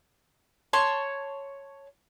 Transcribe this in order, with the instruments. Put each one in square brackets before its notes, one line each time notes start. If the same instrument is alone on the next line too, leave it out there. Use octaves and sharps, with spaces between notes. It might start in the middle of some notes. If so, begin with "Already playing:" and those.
[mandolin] C#5 A5 C6 C#6